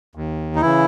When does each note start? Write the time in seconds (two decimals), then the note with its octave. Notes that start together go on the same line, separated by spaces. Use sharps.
0.15 D#2
0.56 D#4
0.61 C#3 E3 E4